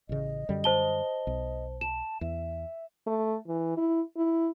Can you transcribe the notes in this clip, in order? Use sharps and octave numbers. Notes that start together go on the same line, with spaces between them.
A1 C#3 D#5
F#2 D3 G3
C5 A5 G7
B1
A5 E7
E2 E5
A3
E3
E4
E4